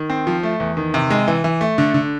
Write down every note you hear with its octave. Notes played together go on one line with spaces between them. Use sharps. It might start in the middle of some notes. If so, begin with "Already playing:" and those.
Already playing: D#3
C4
F3
A3
E2
D#3
C3
G#3
E3
E3
A3
D3
D3